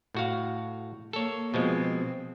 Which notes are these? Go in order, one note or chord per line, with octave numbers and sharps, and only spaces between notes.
A2 F#4 F5
A#3 A4 C#5
B2 F3 G#3 C4